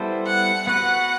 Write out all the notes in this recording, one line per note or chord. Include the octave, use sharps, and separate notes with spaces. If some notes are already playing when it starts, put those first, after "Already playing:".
Already playing: G3 B3 E4 A4 C5
F#5
B3 F#4 B4 F#5